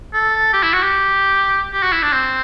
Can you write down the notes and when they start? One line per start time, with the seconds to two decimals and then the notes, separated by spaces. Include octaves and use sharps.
0.14 A4
0.53 G4
0.63 E4
0.73 F#4
0.83 G4
1.73 G4
1.83 F#4
1.92 E4
2.02 D4
2.13 C4